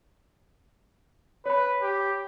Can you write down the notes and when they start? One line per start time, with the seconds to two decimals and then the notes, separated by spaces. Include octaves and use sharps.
1.46 B4 C#5 B5
1.82 G4